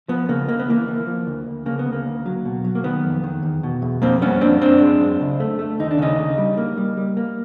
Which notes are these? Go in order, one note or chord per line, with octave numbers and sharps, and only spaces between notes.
F3 B3
C#3 A#3
C#2 A#3
B3
E3 A#3
E3
F3
D2
D2
C#3 A#3
B3
D2
A#3
D2
F#3
B2
F#3
A#3
D#3 B3
F2
D#3
E2
B2
E2
F2 A#3 C4
G3 B3 C#4
F2 C4 D4
F#2 C4 D4
G#3
F#2
C#2
A3
A3
D#2 D#4
D4
C#3 C#4 D#4
C#3
G3
A#3
G3
G3
A#3